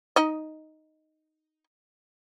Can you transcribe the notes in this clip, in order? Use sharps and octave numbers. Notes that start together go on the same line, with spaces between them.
D#4 D#5